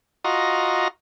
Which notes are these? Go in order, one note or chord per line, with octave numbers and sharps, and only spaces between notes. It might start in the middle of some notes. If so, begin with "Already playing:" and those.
F4 F#4 D#5 A#5